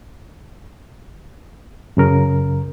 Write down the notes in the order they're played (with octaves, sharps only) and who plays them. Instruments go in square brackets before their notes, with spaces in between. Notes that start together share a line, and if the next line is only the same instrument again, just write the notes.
[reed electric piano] F#2 C#3 A#4